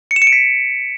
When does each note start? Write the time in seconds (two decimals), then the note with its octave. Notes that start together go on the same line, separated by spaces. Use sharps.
0.11 C#7
0.16 E7
0.22 C#7
0.27 D7
0.32 B6